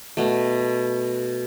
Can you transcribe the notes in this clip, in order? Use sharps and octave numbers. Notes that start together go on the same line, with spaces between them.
B2 A3